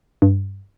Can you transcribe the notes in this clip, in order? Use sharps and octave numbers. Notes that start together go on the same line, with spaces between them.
G2